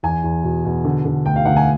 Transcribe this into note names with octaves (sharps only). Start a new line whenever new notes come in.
E2 G#5
E2
B2
B2
D3
D3
D2 G5
F5
D2 F#5
G#5